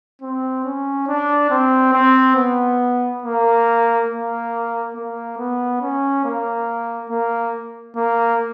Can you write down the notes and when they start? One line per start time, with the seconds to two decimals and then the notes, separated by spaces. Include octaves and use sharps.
0.22 C4
0.65 C#4
1.08 D4
1.50 C4
1.93 C4
2.36 B3
3.23 A#3
4.09 A#3
4.94 A#3
5.38 B3
5.81 C#4
6.24 A#3
7.10 A#3
7.96 A#3